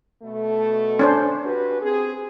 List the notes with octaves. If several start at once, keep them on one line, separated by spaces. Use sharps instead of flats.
B2 A3
C#4 D4 C5
F#4 G4 B4
C4 G#4